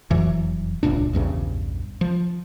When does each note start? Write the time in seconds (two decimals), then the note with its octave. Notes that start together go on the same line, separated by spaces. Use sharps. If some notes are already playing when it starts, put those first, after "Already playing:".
0.10 E1 F2 E3 F#3
0.83 D#1 C#2 A#2 D4
1.13 A#1 E2 G2 C#3
2.01 F3